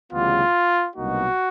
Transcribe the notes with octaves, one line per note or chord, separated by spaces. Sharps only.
D2 C#3 E3 G3 B3 F4
C2 B2 F#3 A#3 D#4 F#4